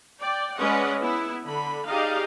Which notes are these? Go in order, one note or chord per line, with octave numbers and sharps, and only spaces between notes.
D5 G5
G#3 C#4 B4 D5 D#5 F#5
B3 E4
D3 B5
D#4 G4 G#4 D5 D#5 F5